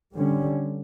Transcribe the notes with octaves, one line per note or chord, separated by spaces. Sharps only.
D3 G3 C#4